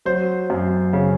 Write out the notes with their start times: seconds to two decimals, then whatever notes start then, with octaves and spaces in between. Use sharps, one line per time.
0.05 F#3 C5
0.50 F#2
0.93 C#3